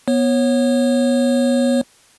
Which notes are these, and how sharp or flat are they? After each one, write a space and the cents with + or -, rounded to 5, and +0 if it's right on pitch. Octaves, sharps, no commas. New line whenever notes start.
B3 -15 C#5 -20